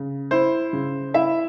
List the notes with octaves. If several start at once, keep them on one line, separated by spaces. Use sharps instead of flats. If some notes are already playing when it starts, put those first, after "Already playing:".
Already playing: C#3
E4 C5
C#3
E4 E5